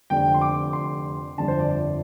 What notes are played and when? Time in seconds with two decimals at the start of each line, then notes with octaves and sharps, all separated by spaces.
0.10 F1 F2 D3 G5
0.34 C6
0.41 D6
0.73 C6
1.38 G1 F2 D3 A5
1.48 C5
1.60 D5
1.70 D5